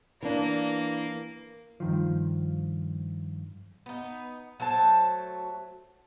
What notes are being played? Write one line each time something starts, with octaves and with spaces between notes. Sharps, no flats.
E3 A#3 D4
G2 D#3 F3
B3 D#4
F#3 A3 C5 A5